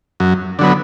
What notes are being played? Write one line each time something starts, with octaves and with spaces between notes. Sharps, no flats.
F#2
D3 F#3 B3